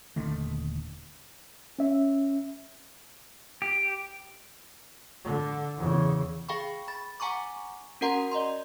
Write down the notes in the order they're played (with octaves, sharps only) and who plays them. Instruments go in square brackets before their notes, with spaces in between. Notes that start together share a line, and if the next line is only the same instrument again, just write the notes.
[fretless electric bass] D#1 D3 D#3 A3
[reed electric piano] C#4 E5
[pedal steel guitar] G4
[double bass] D3
E2 C#3
[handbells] G#4 F5 G5 B5 C#6
B5 A6
F#5 G#5 A#5 C#6 D6
C#4 F#4 A#4 F#5 A#5 C6
D5 D#5 A#5 C6